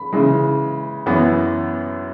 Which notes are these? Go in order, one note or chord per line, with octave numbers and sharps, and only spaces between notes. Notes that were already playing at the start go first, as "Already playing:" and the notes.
Already playing: B5
C#3 E3 G#3
F#2 E3 B3